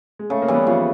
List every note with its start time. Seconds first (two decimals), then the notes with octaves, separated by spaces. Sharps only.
0.19 G#3
0.30 C#3 A3
0.42 A#3
0.48 E3 G3
0.54 B3
0.67 C#3 F3